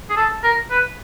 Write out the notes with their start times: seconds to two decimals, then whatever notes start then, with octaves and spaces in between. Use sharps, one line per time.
0.10 G#4
0.17 A4
0.44 A#4
0.70 B4